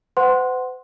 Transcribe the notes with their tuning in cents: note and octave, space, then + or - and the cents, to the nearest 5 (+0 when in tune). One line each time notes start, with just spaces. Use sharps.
C5 -45 F#5 +10 C6 +0